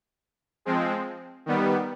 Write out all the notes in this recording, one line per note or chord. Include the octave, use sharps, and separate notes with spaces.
F3 G#3 C4
D#3 G3 B3